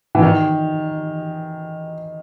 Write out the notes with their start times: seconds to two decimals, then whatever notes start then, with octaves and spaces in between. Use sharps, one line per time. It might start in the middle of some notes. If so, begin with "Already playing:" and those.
0.15 E3
0.23 D#3